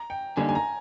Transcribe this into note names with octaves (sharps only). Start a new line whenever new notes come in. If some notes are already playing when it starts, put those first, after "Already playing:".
Already playing: A#5
G5
D3 G3 A#3 D#4 G#5
G#5
A#5